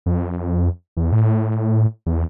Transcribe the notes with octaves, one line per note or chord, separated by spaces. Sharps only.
F2
E2
A2
E2